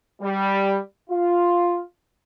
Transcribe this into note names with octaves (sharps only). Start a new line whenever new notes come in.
G3
F4